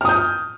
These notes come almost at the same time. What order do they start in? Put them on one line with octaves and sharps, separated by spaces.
F6 D#6 G6